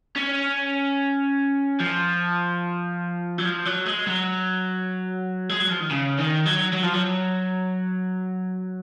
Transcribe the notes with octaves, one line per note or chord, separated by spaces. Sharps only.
C#4
F3
F#3
F3
F#3
G#3
F#3
G#3
F#3
F3
D#3
C#3
D#3
F#3
F#3
F3
F#3